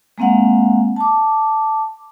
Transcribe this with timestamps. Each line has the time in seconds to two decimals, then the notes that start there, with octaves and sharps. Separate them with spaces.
0.18 G#3 A#3 C4 F5 F#5
0.96 A5 D6